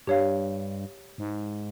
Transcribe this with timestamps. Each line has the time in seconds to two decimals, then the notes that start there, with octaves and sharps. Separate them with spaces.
0.07 G2 G4 C#5 F5
1.18 G#2